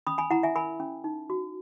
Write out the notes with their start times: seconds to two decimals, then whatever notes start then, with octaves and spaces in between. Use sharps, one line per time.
0.07 C#4 B5 D#6
0.18 G#5 B5
0.30 E4 F#5 A#5
0.43 E5 G#5
0.55 A#4 G#5 B5
0.80 C#4
1.04 D#4
1.30 F#4